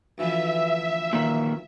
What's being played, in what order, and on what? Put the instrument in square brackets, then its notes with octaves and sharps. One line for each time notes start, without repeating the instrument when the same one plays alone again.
[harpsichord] D2 E3 F3 [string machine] E5
[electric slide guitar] A#2 D#3